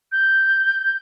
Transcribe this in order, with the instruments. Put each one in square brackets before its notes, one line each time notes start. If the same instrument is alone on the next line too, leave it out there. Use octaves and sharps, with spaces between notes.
[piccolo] G6